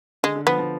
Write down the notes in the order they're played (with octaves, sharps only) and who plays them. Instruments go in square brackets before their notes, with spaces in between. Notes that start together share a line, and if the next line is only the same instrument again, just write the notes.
[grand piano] D3 [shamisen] G#3
[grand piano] D3
[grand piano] F3 [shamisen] B3
[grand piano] F3